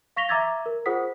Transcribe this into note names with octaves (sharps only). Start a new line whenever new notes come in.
F5 C#6 A#6 B6 F7 G7
E5 A#5 D6 E6 G#6 A6
A#4
F4 G#4 C5 F#5 D#6 B6